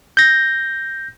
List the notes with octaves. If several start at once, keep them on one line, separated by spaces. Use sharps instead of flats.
G6 A#6